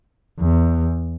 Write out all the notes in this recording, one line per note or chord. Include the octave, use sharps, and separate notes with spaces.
E2